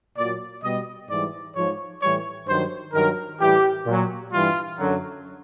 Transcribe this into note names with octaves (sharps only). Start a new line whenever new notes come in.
A#2 F#3 D5
B2 G3 D#5
G#2 E3 G3 D5
G#2 F3 C#5
A2 E3 G3 C#5
G2 D#3 F#3 C5
G2 D#3 F#3 A#4
A2 E3 G3 G4
A#2 F#3
G2 E3 G3 F4
F#2 D3 F#3